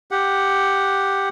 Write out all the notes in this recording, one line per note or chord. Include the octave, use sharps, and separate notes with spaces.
G4 F#5